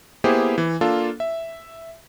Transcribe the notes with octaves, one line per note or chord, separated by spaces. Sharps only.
A#3 B3 E4 G4 G#4 C5
E3
A#3 D4 F4 A4
E5